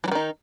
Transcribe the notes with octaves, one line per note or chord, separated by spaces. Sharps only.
D#3 E3 F#3 D#4